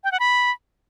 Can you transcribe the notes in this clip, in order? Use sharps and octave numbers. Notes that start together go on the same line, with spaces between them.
G5
F#5
B5